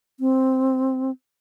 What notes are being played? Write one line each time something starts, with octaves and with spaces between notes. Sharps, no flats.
C4